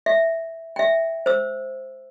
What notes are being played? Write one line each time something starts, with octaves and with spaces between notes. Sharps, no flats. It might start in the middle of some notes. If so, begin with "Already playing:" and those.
E5
E5 G5
C5 E6